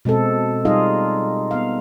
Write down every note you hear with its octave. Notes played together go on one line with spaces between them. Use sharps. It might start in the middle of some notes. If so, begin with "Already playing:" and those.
B2 G#3 C4 A4
G3 D#4 F4 G#4 D#5 F5
B3 F5